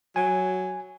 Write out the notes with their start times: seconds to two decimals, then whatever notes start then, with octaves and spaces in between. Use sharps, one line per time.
0.16 F#3 G#5